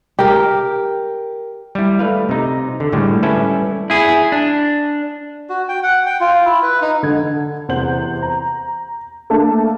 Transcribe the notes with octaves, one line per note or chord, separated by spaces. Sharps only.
G4 A#4
G3 E4
A3 B4 F5
C3 D#4
D3
A2 D3 G3 G#3
G3 C#4 E4 A4 B4 E5
E4 G#4
D4
F#4
G5
F#5
G5
F4
E4
B4
D#4
D3 G#6
E2 C3 C5 F#5 G6 F#7
A#5
A3 A#3 D4 A5